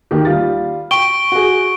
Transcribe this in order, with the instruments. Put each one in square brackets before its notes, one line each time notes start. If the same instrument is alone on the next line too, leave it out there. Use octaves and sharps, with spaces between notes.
[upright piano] D#2 D#3 G4
G3 F4 A6
[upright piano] G5 [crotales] C#6 D7 G7
[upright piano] F#4 G#4